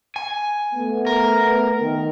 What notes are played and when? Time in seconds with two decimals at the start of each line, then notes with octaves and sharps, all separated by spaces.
0.16 G#5
0.74 A3 B3
1.07 A#4
1.80 D#3